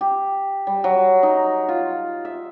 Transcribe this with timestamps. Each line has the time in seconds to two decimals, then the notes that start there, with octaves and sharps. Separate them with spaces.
0.01 G4
0.67 G3
0.84 F#3
1.23 D#4
1.69 F4
2.25 E5